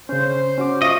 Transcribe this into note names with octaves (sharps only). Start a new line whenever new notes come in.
C#3 C#4 C5
C#4 F#4 D6
F4 D#5 E5 C#6